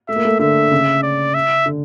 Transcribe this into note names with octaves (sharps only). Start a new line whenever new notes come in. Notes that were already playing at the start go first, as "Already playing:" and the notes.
A3 E5
A#3
A3
D3 E5
C#3
D5
E5
D3